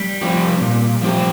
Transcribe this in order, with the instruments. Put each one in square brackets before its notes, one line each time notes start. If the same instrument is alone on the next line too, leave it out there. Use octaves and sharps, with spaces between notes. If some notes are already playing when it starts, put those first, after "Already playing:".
Already playing: [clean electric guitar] G3
[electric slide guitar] F3 C4 G4
A#2
F3 C4 G4